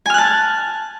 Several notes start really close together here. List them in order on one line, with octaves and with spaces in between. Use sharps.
G#5 F6 F#6 A5